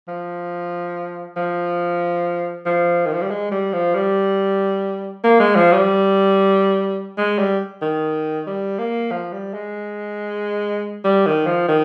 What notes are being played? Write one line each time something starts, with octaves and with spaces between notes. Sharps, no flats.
F3
F3
F3
D#3
F3
G3
G#3
G3
F3
G3
A#3
G#3
F3
G3
G#3
G3
D#3
G3
A#3
F3
G3
G#3
G3
D#3
F3
D#3